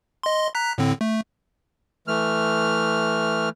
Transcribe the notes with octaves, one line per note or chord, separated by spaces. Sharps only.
D#5 C6
A#5 F#6 B6
A2 D3 C4
A3
E3 A3 F6